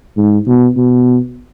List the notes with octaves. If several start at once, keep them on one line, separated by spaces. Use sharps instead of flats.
G#2
B2
B2